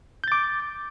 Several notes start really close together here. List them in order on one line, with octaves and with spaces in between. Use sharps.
G6 A6 D6